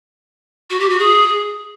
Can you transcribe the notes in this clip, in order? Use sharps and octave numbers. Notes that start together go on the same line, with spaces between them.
F#4
G4
F#4
G#4